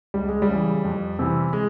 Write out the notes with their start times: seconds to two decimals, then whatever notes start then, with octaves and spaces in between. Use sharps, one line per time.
0.14 C#2 G3
0.29 G#3
0.42 G3
0.49 C#3 E3
0.84 F2
1.19 C3 E3
1.53 G#3